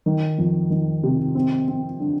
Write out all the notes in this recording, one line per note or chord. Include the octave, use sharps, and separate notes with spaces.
D#3
F2
D#3
C3
C4
C4
D3